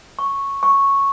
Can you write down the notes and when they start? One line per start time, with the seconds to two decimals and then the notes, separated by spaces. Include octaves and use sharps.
0.19 C#6
0.63 C#6